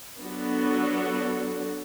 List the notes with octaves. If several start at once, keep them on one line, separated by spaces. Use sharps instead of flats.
F#3 B3 D4 F#4 A4